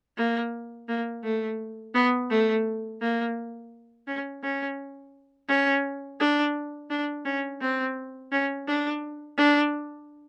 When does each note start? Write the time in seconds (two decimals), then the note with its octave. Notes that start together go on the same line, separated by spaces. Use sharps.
0.17 A#3
0.88 A#3
1.24 A3
1.94 B3
2.30 A3
3.01 A#3
4.07 C#4
4.43 C#4
5.48 C#4
6.20 D4
6.90 D4
7.25 C#4
7.61 C4
8.32 C#4
8.68 D4
9.38 D4